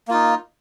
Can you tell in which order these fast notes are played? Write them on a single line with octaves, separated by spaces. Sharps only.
A#3 F4 D#4